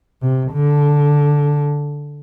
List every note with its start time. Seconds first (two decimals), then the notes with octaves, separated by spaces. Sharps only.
0.22 C3
0.53 D3